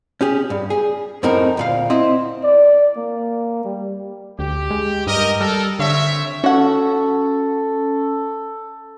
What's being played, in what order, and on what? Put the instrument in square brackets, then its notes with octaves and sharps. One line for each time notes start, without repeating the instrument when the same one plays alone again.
[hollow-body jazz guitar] C#4 G4 G#4
G2
G#4
F#2 A2 C4 D#4 A#4
D2 A#2 F5
C4 E4 D#5
[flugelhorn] D5
A#3
G3
[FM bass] D2 [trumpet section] G4
[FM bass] G#3
[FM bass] G2 [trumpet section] A#4 D#5
[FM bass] G3 [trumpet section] A4 A#4
[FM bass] D3 [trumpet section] C4 C#5 E5
[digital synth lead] C#4 [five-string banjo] F#4 F#5 [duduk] A4